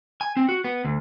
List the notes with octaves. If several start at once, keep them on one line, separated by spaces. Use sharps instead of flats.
G#5
C4
F#4
B3
D2